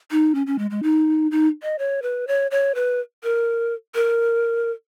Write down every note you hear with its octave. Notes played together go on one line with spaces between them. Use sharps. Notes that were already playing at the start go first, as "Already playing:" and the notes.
D#4
C#4
C#4
G#3
G#3
D#4
D#4
D#5
C#5
B4
C#5
C#5
B4
A#4
A#4